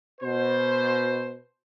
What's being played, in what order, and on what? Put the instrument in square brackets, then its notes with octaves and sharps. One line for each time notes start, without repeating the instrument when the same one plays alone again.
[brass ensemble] B2 C5